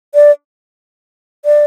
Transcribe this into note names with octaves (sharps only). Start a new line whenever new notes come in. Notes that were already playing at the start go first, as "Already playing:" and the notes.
D5
D5